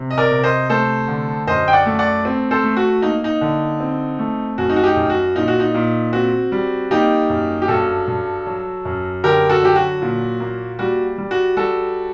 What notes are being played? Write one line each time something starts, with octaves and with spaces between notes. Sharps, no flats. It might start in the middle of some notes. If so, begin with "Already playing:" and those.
Already playing: C3
D#5
A#4 D5
C3
C5 D#5
A3 A4 C5
D3
F#2 C5 D#5
G5
D5 F#5
A3
D5 F#5
C4
A4 C5
A3
F#4
A#3 D#4
D#4
D3
C4
A3
F#2 F#4
D#4
F#4
D#4 G4
F#2
F#4
A#2 D#4
F#4
D#4
A#2
C4 F#4
G3
A#3 D#4 G4
F#2
G4
G2 F#4 A4
G2
F#3
F#2
D3 G4 A#4
F#4 A4
F#3 G4
F#4
A#2
A#3
G3 F#4
G3
F#4
G3 F#4 A4